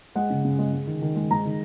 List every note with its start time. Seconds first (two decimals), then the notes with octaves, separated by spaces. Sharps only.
0.16 G#3 F#5
0.30 C#3
0.45 C#3
0.59 G#3
0.73 G#3
0.87 D#3
1.02 D#3
1.16 G#3
1.31 G#3 A#5
1.45 D#3